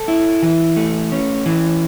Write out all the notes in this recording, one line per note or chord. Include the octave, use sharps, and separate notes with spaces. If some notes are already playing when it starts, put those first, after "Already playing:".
Already playing: A4
E4
E3
A3
C#4
E3